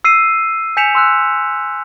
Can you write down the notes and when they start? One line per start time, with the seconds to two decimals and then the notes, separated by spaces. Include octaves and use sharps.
0.04 E6 C7 D#7
0.77 G#5 G6 B6 C#7 E7 F7
0.95 C6 E6 F#6